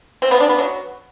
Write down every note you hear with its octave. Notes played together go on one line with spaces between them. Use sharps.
C4
B3
D4
B3
F#3